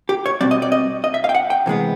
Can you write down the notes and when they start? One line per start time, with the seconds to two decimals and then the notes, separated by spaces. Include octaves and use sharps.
0.09 G4
0.26 C#5
0.41 B2 G3 C4 D5
0.51 D#5
0.62 D5
0.72 D#5
1.04 D#5
1.14 E5
1.24 F5
1.29 G5
1.35 F#5
1.50 G5
1.66 C3 E3 G#3 B3